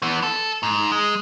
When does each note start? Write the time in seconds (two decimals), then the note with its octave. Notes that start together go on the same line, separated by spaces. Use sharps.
0.02 E3 B3
0.23 A4
0.63 G#2
0.92 G#3